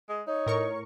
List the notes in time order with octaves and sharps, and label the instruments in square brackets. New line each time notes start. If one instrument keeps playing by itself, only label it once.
[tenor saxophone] G#3
[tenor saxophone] D#4 [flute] C#5
[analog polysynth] A2 A#4 C#6